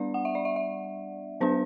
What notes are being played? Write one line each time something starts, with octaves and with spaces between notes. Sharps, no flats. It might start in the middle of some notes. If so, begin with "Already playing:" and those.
Already playing: G3 B3 D4 D5
F#5
E5
D5
E5
E5
F#3 B3 D4 C5